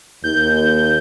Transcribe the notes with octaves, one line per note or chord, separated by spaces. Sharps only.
D#2 G6